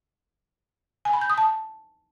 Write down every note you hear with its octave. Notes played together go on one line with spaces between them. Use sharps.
G#5
B5
G6
D#6
A5